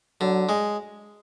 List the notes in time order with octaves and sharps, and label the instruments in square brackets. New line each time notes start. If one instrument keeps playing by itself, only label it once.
[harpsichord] D3 [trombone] F#3
[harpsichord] G#3